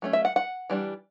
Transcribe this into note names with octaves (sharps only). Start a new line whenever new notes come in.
F#3 A3 C#4
E5
F#5
F#5
E3 G3 D4